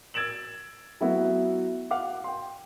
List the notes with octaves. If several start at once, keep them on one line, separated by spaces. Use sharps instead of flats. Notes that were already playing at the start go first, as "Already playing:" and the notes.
E6 G#6 A6 D7 E7 F#7
F#3 A3 B3 E4 F#4
F5 F#5 D6
G5 C6